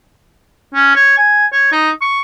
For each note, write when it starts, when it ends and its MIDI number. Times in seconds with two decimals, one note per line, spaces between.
0.74 0.95 61
0.95 1.14 73
1.17 1.46 80
1.52 1.71 73
1.72 1.90 63
2.01 2.20 85